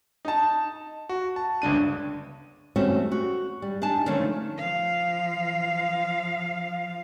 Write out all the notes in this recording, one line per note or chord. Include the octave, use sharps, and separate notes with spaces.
D#4 A5
F#4
A5
G1 C#2 D4 D#7
E3 G3 A3 C4 C#4 F#4
F#4
G3
D4 D#4 G#5 A5
D3 D#3 F3 A3 C#4
F3 F5